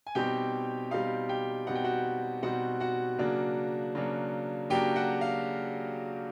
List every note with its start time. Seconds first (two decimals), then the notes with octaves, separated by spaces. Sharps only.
0.07 G#5
0.15 B2 G3 C4 D#4 G4 G5
0.91 B2 G3 C4 D#4 F5
1.29 G4 G5
1.67 B2 G3 C4 D#4 F#5
1.75 G5
1.84 F#4 F#5
2.42 B2 G3 C4 D#4 F#4 F#5
2.80 F#4 F#5
3.18 C#3 F#3 A#3 D4
3.95 C#3 F#3 A#3 D4
4.70 C#3 F#3 A#3 D4 G4 G5
4.95 F#4 F#5
5.21 F5